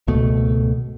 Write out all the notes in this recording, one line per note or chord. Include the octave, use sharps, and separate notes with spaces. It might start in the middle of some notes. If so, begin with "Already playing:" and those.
G#1 C#2 B2 A3